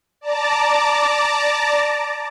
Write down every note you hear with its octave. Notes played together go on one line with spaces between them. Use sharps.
D5 A5 A#5 D6